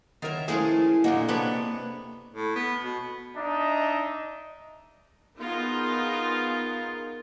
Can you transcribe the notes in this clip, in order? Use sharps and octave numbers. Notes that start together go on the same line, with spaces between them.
D#3 B3 A#4 C#5 E5
F3 G#3 A3 C#4 E4 G#4 F5
A#2 D3 A#3 F#4 D#5
C3 B3 D4 A4 C#5 B5
A2
B3
B2
D4 D#4 D#5 E5
B3 D#4 F4 G#4 A#4